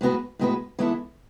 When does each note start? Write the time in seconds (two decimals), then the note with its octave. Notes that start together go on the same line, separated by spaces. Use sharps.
0.01 A2 G#3 B3 F#4 B4
0.39 A2 G#3 B3 F#4 B4
0.79 E3 G#3 B3 E4 A4